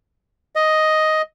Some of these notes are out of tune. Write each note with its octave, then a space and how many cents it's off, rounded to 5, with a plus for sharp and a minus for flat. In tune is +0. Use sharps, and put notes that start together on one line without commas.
D#5 +5